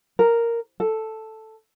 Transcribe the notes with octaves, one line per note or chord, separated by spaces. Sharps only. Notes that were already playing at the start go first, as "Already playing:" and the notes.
A#4
A4